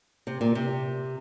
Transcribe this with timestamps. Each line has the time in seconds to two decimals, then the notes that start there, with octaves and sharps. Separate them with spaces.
0.27 C3
0.41 A#2
0.55 C3